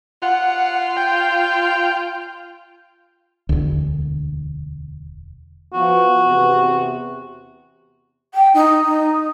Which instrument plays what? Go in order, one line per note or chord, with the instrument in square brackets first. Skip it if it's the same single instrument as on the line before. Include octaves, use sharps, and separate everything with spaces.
[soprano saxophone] F4 [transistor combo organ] F#5
[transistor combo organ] G5
[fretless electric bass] E1 D2
[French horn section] F3 B3 [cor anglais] F#4
[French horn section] E2 C3 B3
[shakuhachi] G5
D#4
D#4